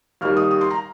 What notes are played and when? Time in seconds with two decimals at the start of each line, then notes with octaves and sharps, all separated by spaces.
0.21 D#2 D#3 G3 F6
0.36 D#6
0.51 D#6
0.61 C6
0.70 A#5